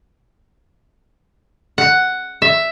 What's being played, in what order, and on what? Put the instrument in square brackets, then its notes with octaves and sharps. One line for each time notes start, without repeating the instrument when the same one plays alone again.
[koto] F#5
E5